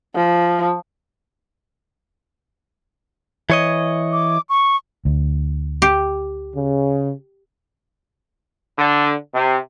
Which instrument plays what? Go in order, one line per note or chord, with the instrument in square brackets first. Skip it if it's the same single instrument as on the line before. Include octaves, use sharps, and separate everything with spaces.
[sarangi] F3
[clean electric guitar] E3 C#5 D#5
[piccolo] D6
C#6
[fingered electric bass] D2
[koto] G4
[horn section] C#3
[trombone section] D3
C3